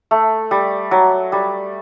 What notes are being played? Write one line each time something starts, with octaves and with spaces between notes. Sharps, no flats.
A3
G3
F#3
G3